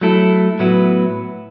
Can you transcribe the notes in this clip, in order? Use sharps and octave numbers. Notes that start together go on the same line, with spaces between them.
F#3 A3 E4 A4
A2 F#3 B3 E4